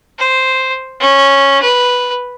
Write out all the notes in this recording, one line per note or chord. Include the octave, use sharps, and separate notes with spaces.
C5
C#4
B4